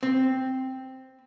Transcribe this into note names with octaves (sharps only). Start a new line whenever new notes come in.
C4